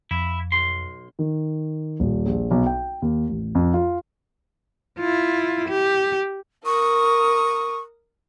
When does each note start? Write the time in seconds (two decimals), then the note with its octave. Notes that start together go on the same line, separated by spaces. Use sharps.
0.11 F2 E4
0.52 B1 C6
1.19 D#3
2.00 D#1
2.26 A#1
2.51 B1
2.66 G5
3.02 D#2
3.29 A1
3.55 F2
3.74 F4
4.99 E4 F4
5.69 G4
6.65 A#4 C#6 D#6